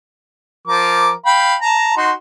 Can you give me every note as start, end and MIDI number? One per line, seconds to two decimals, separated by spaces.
0.67 1.11 53
0.67 1.11 70
0.67 1.11 86
1.26 1.55 77
1.26 1.55 79
1.26 1.55 83
1.61 1.96 81
1.61 1.96 82
1.97 2.12 63
1.97 2.12 66
1.97 2.12 84